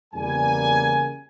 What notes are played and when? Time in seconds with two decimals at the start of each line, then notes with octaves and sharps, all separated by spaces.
0.14 E2 C#3 G3 A#3 G#5